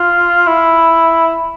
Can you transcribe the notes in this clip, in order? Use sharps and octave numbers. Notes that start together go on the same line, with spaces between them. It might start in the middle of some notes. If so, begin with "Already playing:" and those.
Already playing: F4
E4